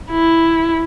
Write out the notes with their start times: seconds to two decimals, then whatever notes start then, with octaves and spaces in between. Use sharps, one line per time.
0.11 E4